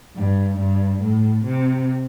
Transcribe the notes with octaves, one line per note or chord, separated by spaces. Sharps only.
G2
G2
A2
C3